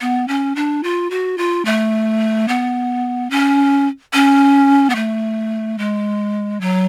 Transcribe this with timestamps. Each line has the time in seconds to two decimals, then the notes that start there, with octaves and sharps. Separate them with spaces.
0.01 B3
0.28 C#4
0.56 D4
0.83 F4
1.10 F#4
1.38 F4
1.65 A3
2.48 B3
3.30 C#4
4.13 C#4
4.90 B3
4.95 A3
5.78 G#3
6.61 F#3